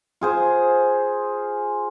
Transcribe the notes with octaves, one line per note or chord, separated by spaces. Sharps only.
F4 G#4 C5